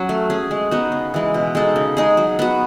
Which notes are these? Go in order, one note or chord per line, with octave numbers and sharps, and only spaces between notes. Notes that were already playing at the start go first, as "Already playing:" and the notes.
Already playing: F#3 C#4 F#4
A3
C#4 G#4
G#3
B3 D#4 F#4
C#3
E3 G#3
B2
G#3 D#4 A4
C#3
G#3 D#4 G#4
F#3
B3 F#4